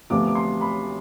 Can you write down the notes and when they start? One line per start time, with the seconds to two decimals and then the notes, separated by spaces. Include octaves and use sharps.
0.10 D2 C3 F3 B3 D6
0.27 D6
0.35 C6
0.61 B5